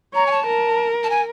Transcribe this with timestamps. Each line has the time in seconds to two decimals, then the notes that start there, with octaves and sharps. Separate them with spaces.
0.14 C#5 A#5
0.26 G#5
0.31 A5
0.46 A#4
1.03 A5
1.10 G#5